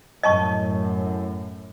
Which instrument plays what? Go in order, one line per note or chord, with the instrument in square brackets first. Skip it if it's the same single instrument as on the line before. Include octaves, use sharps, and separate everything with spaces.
[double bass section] F#2 A2 [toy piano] D#5 A5 C#6